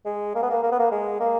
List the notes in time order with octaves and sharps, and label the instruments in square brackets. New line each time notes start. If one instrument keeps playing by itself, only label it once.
[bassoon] G#3
A#3
B3
A#3
A#3
B3
A#3
G#3
A#3